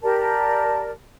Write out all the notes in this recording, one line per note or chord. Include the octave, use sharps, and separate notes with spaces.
G4 A#4 D5 A5